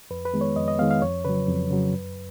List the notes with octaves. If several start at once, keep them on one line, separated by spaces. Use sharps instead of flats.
F2 B4
B4
D#3 G#3 B3
C#5
F2 D#5
D#5
D#3 G#3 B3 F5
F5
F2 C#5
C#3 F#3 B4
F2
C#3 F#3
F#2